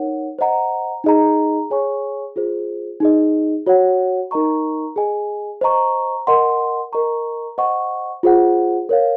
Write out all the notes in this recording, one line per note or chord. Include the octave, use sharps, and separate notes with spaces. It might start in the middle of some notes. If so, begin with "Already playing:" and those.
Already playing: D#4 A#4 C#5 F#5
C5 D#5 F#5 A#5
D#4 G#4 D#5 A#5
G#4 C#5 G#5 C#6
F4 G#4 C5
D#4 G#4 D#5
F#4 C#5 F#5
D#4 A#4 D#5 A#5 C#6
G#4 D#5 G#5
C5 D#5 A#5 C#6
A#4 D#5 F#5 C6
A#4 D#5 A#5 C#6
C5 D#5 F#5 C#6
F4 G#4 C5 F#5
A#4 C#5 F5